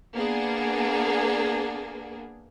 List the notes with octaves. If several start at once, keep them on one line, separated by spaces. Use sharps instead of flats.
A#3 B3 D4 G#4